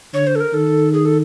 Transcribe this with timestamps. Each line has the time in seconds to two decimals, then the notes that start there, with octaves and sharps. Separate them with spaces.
0.14 D3 C#5
0.27 C5
0.35 A4
0.40 A#4
0.53 D#3 A4
0.93 G#4
1.05 A4